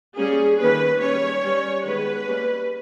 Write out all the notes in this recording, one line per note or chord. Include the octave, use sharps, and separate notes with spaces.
G3 A#3 C#4 G#4
D#3 A#3 C#4 B4
G3 C#4 C#5
G3 C#4
D#3 G#3 B3 B4
G3 A#3 C#4